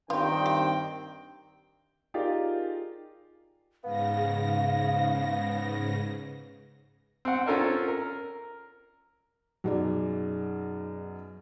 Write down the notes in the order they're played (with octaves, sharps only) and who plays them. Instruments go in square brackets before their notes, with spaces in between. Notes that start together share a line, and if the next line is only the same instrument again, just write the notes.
[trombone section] G2 D#3 [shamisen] B3 F4 [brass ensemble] C4 G5
[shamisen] G4
[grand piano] D#4 F4 G4 G#4 A#4 D5
[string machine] G#2 C#3 A#6 [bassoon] B3 [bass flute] F5
[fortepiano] C4 F#5
C#4 F4 A4 A#4 C5 D5
A#4
[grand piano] F#2 B2 [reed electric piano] F#3 [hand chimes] D#4 G#4 D5